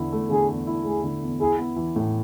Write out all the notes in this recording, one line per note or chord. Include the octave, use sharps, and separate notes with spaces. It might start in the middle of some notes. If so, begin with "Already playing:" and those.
Already playing: E2 D3 E4
A3
D3 G#4
E2
E4
A3 G#4
D3
E2
E4 G#4
B3
E3
A2